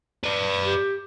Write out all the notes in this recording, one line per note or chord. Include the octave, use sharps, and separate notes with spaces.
B4 D5
G4